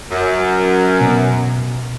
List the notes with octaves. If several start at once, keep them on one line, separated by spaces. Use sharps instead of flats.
F#2
B2